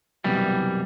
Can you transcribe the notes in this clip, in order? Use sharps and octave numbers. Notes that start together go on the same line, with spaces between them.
C2 F#2 B2 E3 G3